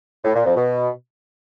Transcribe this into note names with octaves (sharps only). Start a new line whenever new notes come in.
A2
A#2
F2
B2